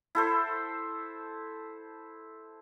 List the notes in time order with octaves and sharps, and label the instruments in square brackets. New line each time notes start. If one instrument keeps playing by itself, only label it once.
[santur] E4 A4 C5